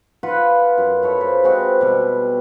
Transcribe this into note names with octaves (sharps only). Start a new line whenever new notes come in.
F4 B4 F#5 B5
F#2
E4 A4 C#5
B4 C5 F5
G#3 C4 F#4 B4
B2 G3